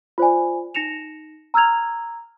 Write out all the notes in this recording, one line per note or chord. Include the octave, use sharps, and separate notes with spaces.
F4 C5 D5 G#5
D#4 A#6 C#7 E7 F7
A#5 E6 F6 G#6 F7